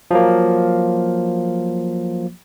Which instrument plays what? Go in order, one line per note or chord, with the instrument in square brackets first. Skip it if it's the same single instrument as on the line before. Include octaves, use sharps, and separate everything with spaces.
[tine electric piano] F3 F#3 A#3